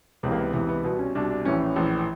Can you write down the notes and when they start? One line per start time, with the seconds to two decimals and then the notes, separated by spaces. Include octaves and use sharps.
0.23 C#2 C3 E3 B3
0.31 A#3
0.38 B3
0.53 C#2 C3 E3 B3
0.69 B3
0.84 C2 B2 B3
0.99 C#4
1.15 C2 B2 D4
1.30 D4
1.45 A#1 A2 E3 C#4
1.76 A#1 A2 E3